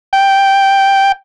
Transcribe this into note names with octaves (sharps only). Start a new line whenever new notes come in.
G5